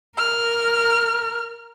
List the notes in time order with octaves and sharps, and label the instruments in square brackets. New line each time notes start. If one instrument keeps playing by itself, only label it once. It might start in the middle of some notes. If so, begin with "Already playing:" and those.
[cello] A#4 [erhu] F6